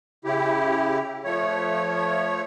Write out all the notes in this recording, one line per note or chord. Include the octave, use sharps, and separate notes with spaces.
C#3 E4 G4
F3 A3 C#5